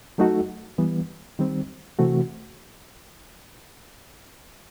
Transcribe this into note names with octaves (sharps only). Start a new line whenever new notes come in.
F#3 A3 D#4 F#4 A4
E3 G3 B3
D#3 G3 C4
C3 E3 A3 C4 F#4